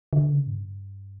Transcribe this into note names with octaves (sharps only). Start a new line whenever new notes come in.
D3
C#3
G#2
G2